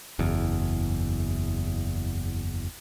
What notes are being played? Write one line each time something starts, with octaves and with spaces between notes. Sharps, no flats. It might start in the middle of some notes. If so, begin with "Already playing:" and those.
F#1 E2